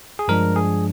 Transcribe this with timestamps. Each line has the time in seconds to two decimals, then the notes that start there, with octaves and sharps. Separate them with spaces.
0.19 G#4
0.28 G2 F3 G#3 D4 A#4
0.56 G#4